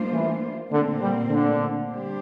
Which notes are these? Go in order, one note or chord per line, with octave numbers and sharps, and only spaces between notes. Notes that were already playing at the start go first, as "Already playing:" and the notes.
Already playing: G3 A#3 D4 F4 C5
E3
A#2 D3 A3 C4
G3
D3
G3 D4 G4 C5